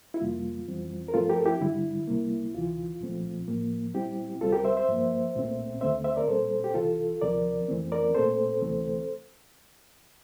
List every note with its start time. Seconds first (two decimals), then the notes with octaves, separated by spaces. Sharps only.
0.14 E4
0.20 F2 C3 G3 A#3 F4
0.67 F2 E3 G3 C4
1.08 A#4
1.14 G2 F3 A3 C4 F4 A4
1.29 G4 A#4
1.38 A4
1.46 E4 G4
1.60 G2 D3 G3 E4
2.07 C2 C3 G3 A#3
2.54 D2 C3 E3 F4
3.01 C2 A#2 F3 A3 C4
3.48 A2 F3 A#3
3.94 A#2 G3 C4 E4 G4
4.41 D2 C3 G3 C4 F4 A4
4.52 G4 A#4
4.65 C5 E5
4.77 C5 E5
4.89 G2 F3 A#3
5.35 C2 A#2 A3 C4
5.81 D2 D3 A3 C4 C5 E5
6.04 C5 E5
6.16 A#4 D5
6.28 A#2 G3 C4 A4 C5
6.64 G4
6.74 C2 C3 E3 F4 A4
7.22 D2 C3 F3 C4 A#4 D5
7.68 F2 E3 A3 C4
7.92 A#4 D5
8.15 A#2 A3 C4 A4 C5
8.62 D2 C3 E3 A3 C4